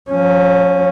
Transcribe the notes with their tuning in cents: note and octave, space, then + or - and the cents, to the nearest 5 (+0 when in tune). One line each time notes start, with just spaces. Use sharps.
F3 +35 C#4 +0